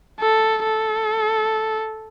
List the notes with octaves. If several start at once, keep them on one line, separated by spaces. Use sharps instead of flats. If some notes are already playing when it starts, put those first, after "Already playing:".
A4
A4